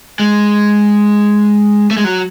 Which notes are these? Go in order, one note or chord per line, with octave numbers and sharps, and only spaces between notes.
G#3
A3
G#3
F#3